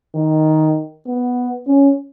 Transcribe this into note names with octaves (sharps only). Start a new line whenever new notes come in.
D#3
B3
C#4